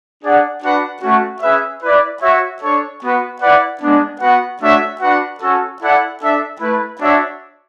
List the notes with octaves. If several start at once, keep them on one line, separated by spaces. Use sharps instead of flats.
D4 G#4 D5 F#5
D4 F#4 B4 F#5
A3 C#4 F#4
C#4 G#4 B4 E5
E4 B4 D5
F#4 C#5 E5
D4 A4 C#5
B3 F#4 B4
E4 B4 D5 F#5
G#3 B3 D4
B3 F#4 B4 F#5
A3 D4 F#4 C#5 E5
D4 F#4 B4 F#5
C#4 F#4 A4
E4 A4 D5 F#5
D4 A4 E5
A3 E4 B4
D4 F#4 C#5 E5